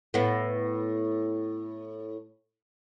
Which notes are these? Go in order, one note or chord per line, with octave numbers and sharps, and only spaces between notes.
A2 B3